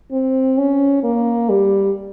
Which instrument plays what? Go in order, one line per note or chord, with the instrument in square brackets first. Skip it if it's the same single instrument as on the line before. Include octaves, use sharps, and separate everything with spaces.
[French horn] C4
C#4
A#3
G3